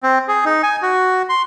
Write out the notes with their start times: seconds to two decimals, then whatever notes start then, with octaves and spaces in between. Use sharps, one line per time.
0.03 C4
0.28 G#4
0.45 D#4
0.63 G#5
0.82 F#4
1.29 C6